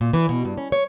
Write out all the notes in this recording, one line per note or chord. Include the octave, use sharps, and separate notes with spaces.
A#2
E3
B2
G2
C#4
C#5